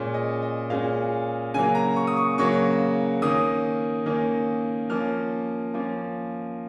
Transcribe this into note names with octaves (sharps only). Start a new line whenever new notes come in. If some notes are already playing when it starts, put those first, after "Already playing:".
Already playing: A#2 G#3 C#4
D#5
D#5
A#2 G#3 C#4 F5
C#3 F#3 A#3 G#5
A#5
C#6
D#6
C#6
C#3 F#3 A#3 C#6
D#3 A#3 C#4 D#6
D#3 A#3 C#4
F3 A#3 C#4 F6
F3 A#3 C#4